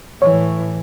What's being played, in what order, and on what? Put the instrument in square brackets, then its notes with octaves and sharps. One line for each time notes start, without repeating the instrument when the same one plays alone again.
[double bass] A2 E3 [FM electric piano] C#5